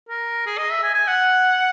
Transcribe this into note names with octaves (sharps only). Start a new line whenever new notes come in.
A#4
G#4
D#5
E5
G#5
G#5
F#5